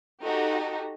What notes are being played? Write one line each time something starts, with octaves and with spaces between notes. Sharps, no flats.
D#4 F#4 G4 A4